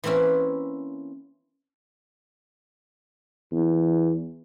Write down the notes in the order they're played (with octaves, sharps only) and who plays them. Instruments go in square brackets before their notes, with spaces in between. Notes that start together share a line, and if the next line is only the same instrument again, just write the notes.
[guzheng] E3 A#3 C4 C#4 E4
[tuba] E2